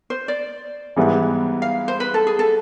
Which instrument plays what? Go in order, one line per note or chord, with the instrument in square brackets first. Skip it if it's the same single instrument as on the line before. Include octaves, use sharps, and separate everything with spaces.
[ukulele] C5
D5
[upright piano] G#2 E3 G3 B3 E4
[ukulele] F5
C5
B4
A4
G#4
A4